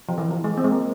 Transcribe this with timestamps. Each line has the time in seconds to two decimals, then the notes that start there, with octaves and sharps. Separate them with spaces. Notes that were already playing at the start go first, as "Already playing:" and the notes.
0.09 F3
0.18 E3
0.31 F3
0.44 G#3
0.57 C4
0.64 G#3
0.71 A#3